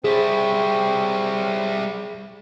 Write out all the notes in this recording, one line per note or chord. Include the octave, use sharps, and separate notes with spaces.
G3 C4 E4 G#4 C5 C#5